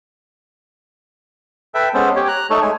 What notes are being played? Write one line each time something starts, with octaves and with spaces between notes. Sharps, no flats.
A4 B4 E5 G5
G#3 B3 C#4 A4 C5
G4 C#5
A#5 F#6
A3 D#4 A4 C#5 C#6
G#3 A3 G#5